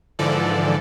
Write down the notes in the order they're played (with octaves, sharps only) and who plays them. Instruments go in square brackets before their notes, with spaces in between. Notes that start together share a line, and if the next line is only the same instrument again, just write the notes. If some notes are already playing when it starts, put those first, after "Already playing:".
[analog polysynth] G#2 D3 E3 F3 A4 D5